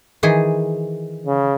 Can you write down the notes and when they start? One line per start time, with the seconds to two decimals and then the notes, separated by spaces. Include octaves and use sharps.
0.23 D#3 E3 G#4
1.26 C#3